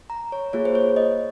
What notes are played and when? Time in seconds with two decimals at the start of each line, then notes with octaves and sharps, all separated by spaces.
0.10 A#5
0.32 C#5
0.53 A#3 F4 G#4 C#5
0.65 C5
0.75 C#5
0.96 D#5